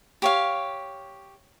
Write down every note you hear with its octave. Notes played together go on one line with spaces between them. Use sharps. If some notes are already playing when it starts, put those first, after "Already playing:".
G4 C#5 F5